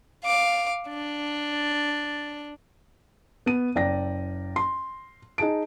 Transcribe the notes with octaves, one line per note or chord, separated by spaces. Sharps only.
F5 D6
D4
B3 D#7
F#1 D5 G5 A#6
C6
D#4 G#4 A5 D7